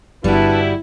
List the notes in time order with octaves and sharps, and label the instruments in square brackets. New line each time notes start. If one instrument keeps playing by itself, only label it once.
[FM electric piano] G1 [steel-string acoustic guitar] G3 F#4 [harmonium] D4 B4 [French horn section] E4